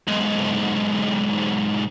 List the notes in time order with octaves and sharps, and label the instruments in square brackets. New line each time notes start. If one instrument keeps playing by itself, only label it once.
[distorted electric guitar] B1 G#2